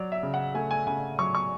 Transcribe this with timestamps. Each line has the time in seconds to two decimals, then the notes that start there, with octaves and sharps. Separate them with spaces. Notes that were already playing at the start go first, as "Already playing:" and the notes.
Already playing: F#3 D5
0.12 E5
0.23 C#3
0.34 F#5
0.54 A3 G#5
0.71 G#5
0.87 C#3 G#5
1.19 F#3 C#6
1.35 C#6